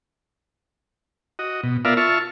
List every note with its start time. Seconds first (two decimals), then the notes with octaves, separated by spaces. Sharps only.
1.39 F#4 D#5
1.63 B2
1.85 B3 F4 A#4 D5 E5 F5
1.97 F4 E5 A5 C#6 F6